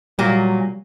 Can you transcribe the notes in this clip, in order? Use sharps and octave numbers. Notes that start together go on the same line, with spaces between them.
A#2 F#3 G3 A#3